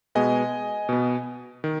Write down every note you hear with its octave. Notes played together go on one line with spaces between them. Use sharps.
B2 G#3 B3 D#5 G#5
B2 B3
D#3